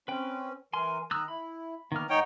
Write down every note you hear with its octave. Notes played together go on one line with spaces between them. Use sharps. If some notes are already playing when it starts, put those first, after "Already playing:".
C4 C#4 B4 G5
E3 A#4 G#5 C6
D#3 A#5 D#6 E6 F#6
E4 B5
D#3 A#3 B3 F6
G#2 D#4 C#5 F#5 G5